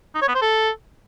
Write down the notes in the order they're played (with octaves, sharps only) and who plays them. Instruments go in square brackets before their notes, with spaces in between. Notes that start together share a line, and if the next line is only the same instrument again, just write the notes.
[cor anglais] D#4
C#5
B3
C5
A4